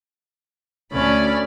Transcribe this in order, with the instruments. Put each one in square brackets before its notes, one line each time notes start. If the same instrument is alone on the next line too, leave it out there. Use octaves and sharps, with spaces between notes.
[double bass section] D2 [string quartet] C#4 D5 B5